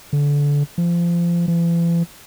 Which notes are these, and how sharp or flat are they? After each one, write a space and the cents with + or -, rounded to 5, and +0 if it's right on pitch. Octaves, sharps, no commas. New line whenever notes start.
D3 -25
F3 -25
E3 +45